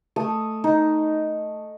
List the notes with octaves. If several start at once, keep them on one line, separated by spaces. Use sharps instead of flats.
A3 D#6
D#4